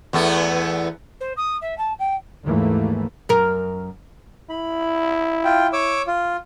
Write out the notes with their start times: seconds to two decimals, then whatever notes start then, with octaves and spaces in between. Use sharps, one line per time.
0.13 E2 A3 B3
1.20 C5
1.37 D#6
1.61 E5
1.78 A5
1.99 G5
2.44 D#2 G#2 E3 A3 A#3
3.29 F#2 A#4
4.50 E4 B5
5.44 F4 G5
5.73 C#5 D6 E6
6.07 F4